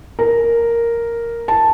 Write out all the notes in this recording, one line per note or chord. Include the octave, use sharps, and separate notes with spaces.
A#4
A5